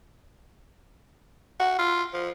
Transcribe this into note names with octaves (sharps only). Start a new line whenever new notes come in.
F#4
F4
F3